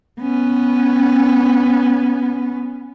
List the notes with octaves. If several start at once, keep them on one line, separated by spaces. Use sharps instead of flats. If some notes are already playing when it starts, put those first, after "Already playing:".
B3 C#4